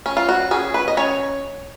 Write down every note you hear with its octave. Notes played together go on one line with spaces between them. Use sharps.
C#4
F4
F#4
C#4 G#4
B4
D#5
C#4 C#5